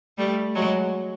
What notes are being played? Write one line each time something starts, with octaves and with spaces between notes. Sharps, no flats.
G3 A3
F#3 G#3